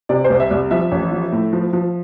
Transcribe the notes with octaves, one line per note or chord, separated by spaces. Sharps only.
C3 D5
C5
C2
E5
C2
F3 E5
A1
F3
A2
F3
F3